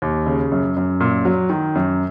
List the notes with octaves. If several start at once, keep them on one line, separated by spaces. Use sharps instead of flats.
D#2
C#3
F#2
F#2
A#2
F#3
D#3
F#2